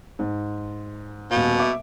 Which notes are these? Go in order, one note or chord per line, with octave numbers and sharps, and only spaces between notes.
G#2
D#1 B2 F5
E5 D6